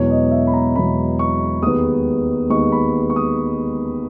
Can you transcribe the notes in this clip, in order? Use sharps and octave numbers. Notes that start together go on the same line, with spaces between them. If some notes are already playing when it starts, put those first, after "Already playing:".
Already playing: E1 E2 B2 F#3 C#5
D#5
E5
B5
A#5
E1 E2 B2 F#3 B5
C#6
D#2 D#3 G#3 B3 D#6
D#2 D#3 G#3 B3 C#6
B5
C#6
D#6